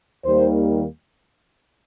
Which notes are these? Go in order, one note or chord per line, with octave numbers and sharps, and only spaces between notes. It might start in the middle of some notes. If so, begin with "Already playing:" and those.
D#2 D#3 G3 A#3 C5